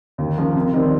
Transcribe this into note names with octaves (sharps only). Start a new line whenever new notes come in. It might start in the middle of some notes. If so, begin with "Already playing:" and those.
D#2
C#3 F3 A#3
C3
D#3 G3 C4